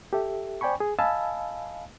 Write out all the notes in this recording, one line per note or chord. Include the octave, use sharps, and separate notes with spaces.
G4 A4 E5
C5 D5 G5 G#5 B5 C#6
G#4
D#5 F5 G#5 A5 B5 E6